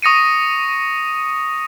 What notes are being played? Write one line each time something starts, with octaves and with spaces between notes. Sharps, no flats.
C#6 D#6 A#6 C#7 D#7